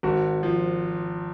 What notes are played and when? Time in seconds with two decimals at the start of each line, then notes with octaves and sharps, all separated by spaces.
0.03 G#1 F#4
0.43 F3